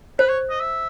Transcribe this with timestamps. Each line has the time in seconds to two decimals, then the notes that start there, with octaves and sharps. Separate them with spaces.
0.19 B4 C5
0.29 C#5
0.50 D#5
0.60 E5